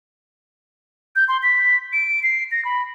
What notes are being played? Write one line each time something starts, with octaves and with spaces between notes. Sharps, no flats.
G6
C6
B6
D7
C7
A#6
B5